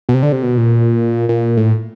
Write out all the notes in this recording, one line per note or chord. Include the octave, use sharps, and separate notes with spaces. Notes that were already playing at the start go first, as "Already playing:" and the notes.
B2
C3
D3
C3
B2
A#2
A#2
A2